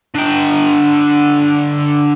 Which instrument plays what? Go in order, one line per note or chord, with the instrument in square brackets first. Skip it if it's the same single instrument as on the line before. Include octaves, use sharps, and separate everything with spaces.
[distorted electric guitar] D3 G5